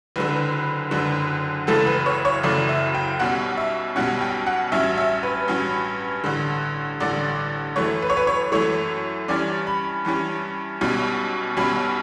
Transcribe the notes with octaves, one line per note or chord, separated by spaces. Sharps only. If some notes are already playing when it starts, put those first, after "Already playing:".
F#1 F#2 D3 B4
F#1 F#2 D3
F#1 F#2 C#3 E3 A3 A4
B4
C#5
C#5
F#1 F#2 C#3 E3 A3 D5
E5
G5
B1 B2 G3 C#4 F#5
E5
B1 B2 G3 C#4 F#5
G5
F#5
A1 G2 F#3 C#4 E5
E5
B4
A1 G2 F#3 C#4
A1 G2 D3
A1 G2 D3 D5
F#2 E3 A3 C#5
B4
C#5
B4
C#5
F#2 E3 A3 C#5
G2 E3 G3 C#4 D5
B5
G2 E3 G3 C#4
B1 B2 G3 C#4
B1 B2 G3 C#4 B5